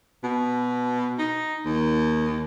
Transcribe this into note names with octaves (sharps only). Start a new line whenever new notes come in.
B2
D#4
D#2